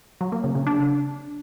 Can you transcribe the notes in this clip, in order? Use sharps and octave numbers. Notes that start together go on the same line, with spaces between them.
F#3
A#3
C#3
C#3
D4